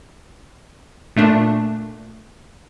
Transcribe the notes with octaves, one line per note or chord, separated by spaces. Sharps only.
A#2 A3 D4